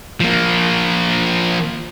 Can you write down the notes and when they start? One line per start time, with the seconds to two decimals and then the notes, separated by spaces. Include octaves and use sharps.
0.20 F3 A#3